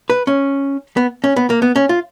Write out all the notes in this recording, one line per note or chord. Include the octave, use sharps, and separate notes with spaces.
B4
C#4
B3
C#4
B3
A#3
B3
C#4
F4